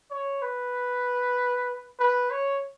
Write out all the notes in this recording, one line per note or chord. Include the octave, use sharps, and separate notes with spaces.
C#5
B4
B4
C#5